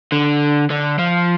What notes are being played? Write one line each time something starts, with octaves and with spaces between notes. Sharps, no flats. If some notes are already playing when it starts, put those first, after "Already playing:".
D3
D3
F3